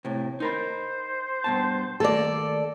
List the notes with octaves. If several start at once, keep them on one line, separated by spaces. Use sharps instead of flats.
A2 C3
D#4 A#4 C5 B5
G2 B2 A5
D#2 A3 A#3 A4 D5